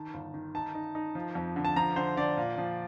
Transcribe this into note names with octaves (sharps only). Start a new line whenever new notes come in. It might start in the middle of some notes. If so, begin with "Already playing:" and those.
Already playing: D#3 A5
G1
D#3
D#4 A5
D#4
D#4
F3
F2
D3
A5
F3 A#5
D3 C5
D3 D5
A#2
F3